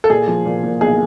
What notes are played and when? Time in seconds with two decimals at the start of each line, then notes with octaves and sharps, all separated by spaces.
0.04 A4
0.10 A#2 G#4
0.28 F3
0.46 A#2
0.64 A#2
0.81 B1 G#4